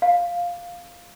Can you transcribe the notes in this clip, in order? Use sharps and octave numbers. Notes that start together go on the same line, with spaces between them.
F5